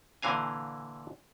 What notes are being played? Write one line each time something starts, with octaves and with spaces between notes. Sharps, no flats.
A#2 D3 E3 F5 G#5